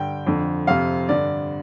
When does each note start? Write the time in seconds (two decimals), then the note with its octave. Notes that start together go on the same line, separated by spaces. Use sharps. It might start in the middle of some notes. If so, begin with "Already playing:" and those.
Already playing: G2 D3 G5
0.26 F2 D3
0.67 F2 C3 F5
1.09 G2 D3 D5